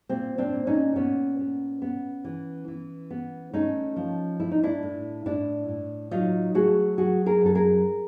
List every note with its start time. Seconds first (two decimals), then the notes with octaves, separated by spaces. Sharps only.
0.09 A#2 C4
0.38 C4 D4
0.53 A#2
0.67 C#4 D#4
0.96 A#2 B3 C#4
1.39 B3
1.82 B3
2.24 E3
2.68 E3
3.10 B3
3.53 A3 C#4 D#4
3.96 F3
4.40 A3 E4
4.52 D#4
4.63 D4 E4
4.83 A2
5.26 A2 D4 E4
5.68 A2
6.11 F#3 D#4 F4
6.55 A3 F#4 G#4
6.97 F#3 F#4 G#4
7.26 G#4 A#4
7.41 F#2 A4
7.55 G#4 A#4